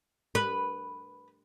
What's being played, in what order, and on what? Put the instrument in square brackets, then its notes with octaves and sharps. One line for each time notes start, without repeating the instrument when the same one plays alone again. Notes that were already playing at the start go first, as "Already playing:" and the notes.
[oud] B4